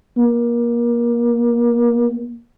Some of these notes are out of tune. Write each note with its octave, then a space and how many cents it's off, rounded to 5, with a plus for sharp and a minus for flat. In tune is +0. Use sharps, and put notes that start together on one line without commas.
A#3 +30